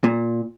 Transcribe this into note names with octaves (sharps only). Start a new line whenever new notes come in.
A#2